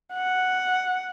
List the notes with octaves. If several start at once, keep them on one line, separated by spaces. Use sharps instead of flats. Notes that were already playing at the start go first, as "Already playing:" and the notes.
F#5